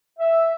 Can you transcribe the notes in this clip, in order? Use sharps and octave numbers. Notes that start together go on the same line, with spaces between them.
E5